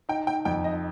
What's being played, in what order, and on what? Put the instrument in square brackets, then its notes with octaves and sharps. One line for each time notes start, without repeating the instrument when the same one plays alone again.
[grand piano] D#4 [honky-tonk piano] G5
[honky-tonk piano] G5
[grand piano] F2 [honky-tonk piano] G5
[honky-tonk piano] D#5